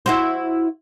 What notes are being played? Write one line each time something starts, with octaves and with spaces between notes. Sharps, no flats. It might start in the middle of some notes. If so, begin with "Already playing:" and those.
E4 F#4 C5